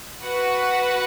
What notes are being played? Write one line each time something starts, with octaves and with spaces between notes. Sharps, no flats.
F#4 B4 F#5